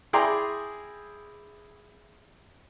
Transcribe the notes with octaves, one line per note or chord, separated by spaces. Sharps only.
E4 G#4 D5 G5 A#5 C6